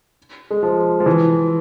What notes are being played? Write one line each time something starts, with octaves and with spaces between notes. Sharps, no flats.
G#3
F3
F3
E3